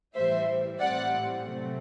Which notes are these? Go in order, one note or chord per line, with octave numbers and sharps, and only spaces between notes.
A2 E3 G3 C5 E5
A2 G3 C4 D5 F#5
C3 F#3 A3 C4